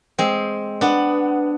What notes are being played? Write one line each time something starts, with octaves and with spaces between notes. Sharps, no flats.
G#3 C4
B3 D4